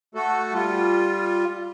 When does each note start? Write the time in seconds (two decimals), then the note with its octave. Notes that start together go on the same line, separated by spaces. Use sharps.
0.15 A3 F#4 A4
0.53 G3 F4